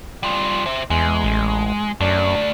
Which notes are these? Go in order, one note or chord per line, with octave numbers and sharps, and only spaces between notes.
G3 F4
C5 E5
E2 G#3
A1
F#2 A3 D5